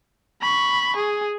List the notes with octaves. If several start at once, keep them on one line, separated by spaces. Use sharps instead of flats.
B5 C#6
G#4